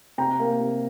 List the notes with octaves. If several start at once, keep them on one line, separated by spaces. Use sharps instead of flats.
C3 G5 A#5
A#3
C3